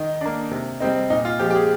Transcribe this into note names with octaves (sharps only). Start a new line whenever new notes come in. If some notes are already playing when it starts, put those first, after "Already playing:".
Already playing: D#3 D#4
A#3 D4
C3
G3 C4 D#4
A#2 D#4
F4
F3 G#3 G4
G4
G#4